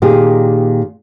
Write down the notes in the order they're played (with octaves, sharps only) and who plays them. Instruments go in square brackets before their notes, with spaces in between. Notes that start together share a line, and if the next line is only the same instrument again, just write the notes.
[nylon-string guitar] A#2 D#3 G4 G#4